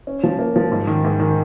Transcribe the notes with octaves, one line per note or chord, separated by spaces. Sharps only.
C#4
F3
A#3
F3
G#2
D#3
G#2
D#3